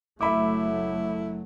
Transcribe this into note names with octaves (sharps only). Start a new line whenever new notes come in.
F#1 F#3 A3 E4 E5 B5 D6